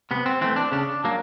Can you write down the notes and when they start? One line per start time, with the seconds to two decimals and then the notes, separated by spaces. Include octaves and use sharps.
0.11 C3 B3
0.26 C4
0.41 E3 A3 C4
0.56 D4
0.72 C#3 D4
1.04 F#3 A#3